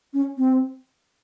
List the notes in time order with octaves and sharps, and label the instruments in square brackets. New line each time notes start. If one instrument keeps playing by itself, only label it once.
[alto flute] C#4
C4